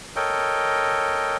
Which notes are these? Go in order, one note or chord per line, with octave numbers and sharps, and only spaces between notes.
A4 A#4 C#5 D#5 G5